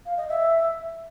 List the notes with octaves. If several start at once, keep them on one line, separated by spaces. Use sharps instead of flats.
F5
D#5
E5